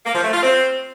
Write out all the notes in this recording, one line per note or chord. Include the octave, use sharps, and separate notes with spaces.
A#3
F3
A3
F4
C4